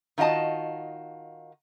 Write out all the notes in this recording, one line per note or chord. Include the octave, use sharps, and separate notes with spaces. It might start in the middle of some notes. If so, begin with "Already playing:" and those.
D#3 F4 F#4 D#5 A5